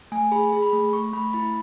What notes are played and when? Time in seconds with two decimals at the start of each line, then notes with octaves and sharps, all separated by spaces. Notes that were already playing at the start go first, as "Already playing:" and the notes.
0.12 A3 G#5
0.32 G#4 B5
0.52 G#4
0.62 B5
0.73 A3
0.93 A3 C#6
1.13 A3 B5
1.33 E4 B5